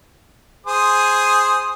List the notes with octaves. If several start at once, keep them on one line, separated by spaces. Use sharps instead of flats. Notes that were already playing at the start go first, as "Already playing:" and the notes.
G#4 C5 D#6